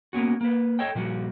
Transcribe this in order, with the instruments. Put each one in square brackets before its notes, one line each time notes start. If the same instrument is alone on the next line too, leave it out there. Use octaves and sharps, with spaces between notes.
[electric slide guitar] A#3 B3 C#4 F#4
A#3 B4
A4 C#5 D#5 G5
A#2 F3 G3 F#4